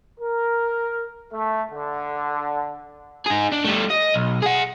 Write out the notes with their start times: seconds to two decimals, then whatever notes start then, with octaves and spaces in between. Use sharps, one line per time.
0.20 A#4
1.33 A3
1.71 D3
3.26 D#4 G#4
3.52 D4
3.65 G3 A3
3.91 D#5
4.14 B1
4.42 G#4 F#5